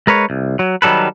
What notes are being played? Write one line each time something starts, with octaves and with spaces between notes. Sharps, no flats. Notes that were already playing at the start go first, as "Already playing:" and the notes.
G#3 A#4 B4 C#5
C2
F#3
D#3 F#3 G3 A4 B4